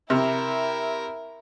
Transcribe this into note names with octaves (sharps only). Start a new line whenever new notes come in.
C3 E4 A#4